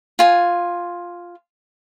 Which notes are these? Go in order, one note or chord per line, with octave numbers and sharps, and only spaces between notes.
F4 G#5